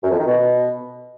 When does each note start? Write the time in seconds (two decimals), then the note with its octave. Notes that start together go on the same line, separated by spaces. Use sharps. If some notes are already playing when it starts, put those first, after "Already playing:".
0.04 F#2
0.11 F2
0.19 D#3
0.27 B2